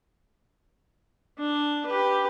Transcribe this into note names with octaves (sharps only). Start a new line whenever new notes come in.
D4
G4 B4